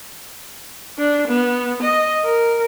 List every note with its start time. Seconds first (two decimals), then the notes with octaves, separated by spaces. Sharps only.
0.98 D4
1.28 B3
1.83 D#5
2.24 A#4